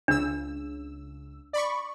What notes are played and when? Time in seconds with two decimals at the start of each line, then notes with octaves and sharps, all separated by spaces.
0.08 C#2 C#3 D4 E6
1.53 D5 B5 C#6